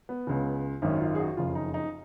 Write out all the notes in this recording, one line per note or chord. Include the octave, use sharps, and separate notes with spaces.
B3
C#2 C#3
G#1 F#2 D#3 C#4
F4
G#4
F#4
F#1 F2 C#3 F4
D#4
D#4